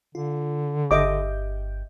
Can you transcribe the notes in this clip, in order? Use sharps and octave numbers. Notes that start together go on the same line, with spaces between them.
D3 F4
G1 G4 D#5 E5 D6 G6